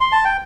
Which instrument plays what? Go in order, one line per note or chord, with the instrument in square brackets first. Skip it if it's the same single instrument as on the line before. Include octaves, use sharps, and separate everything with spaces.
[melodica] C6
A5
G5